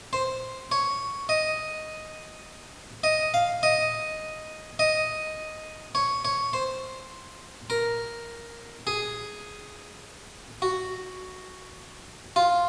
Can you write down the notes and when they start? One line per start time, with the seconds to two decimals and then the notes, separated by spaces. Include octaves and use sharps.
0.13 C5
0.72 C#5
1.29 D#5
3.04 D#5
3.34 F5
3.63 D#5
4.79 D#5
5.95 C#5
6.25 C#5
6.53 C5
7.70 A#4
8.87 G#4
10.62 F#4
12.36 F4